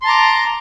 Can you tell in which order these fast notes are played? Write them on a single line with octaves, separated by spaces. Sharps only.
C6 A5 A#5 D6